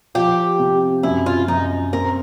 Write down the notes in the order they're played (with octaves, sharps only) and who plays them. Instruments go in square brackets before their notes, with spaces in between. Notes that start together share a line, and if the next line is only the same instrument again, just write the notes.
[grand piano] F3 [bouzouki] G4
[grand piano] C3
[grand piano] F#2 [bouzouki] E4
[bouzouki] F4
[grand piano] F#2 [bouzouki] D#4
[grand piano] C4 [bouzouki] A#4